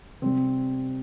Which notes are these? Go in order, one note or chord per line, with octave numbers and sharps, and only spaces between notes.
C3 G3 C4